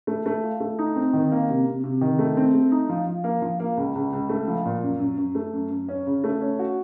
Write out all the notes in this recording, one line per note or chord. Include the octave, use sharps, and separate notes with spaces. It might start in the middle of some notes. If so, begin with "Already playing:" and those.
A3
A3
F4
A3
D#4
C4
D#3
A#3
C3
C3
C3
D#3
A3
C4
A3
D#4
F3
F3
A#3
F3
A#3
C#2
C#2
C#2
A3
F3
A#2
F#2
F#2
F#2
A3
F#2
F#2
C#4
C#3
A3
C#4
F#4